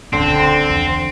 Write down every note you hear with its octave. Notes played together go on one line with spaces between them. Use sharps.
D#1 C#2 D3 C4
E2